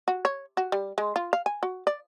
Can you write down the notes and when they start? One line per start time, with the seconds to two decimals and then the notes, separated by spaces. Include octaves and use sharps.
0.08 F#4
0.25 C#5
0.57 F#4
0.72 G3
0.98 G#3
1.16 F4
1.33 F5
1.46 G#5
1.63 F#4
1.87 D5